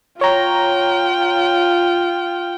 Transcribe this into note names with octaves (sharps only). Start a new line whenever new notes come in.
F4 C#5 G5 A#5